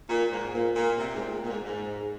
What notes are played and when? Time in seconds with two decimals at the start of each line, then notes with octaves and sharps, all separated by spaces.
0.09 A#2
0.31 G#2
0.53 A#2
0.76 A#2
0.98 C3
1.15 G#2
1.21 A#2
1.43 A#2
1.50 G#2
1.64 G#2